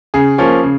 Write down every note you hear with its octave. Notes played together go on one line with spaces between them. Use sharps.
C#3 G#4
F3 A#3 C#4
C#3